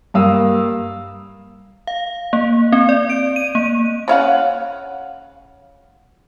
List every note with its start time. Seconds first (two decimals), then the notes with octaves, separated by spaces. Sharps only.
0.14 G2 A#3 F5 D#6 E6
1.87 F5
2.33 A#3
2.72 C4
2.89 D5
3.10 D7
3.36 D#7
3.55 A#3
4.08 C#3 C#4 F5 F#5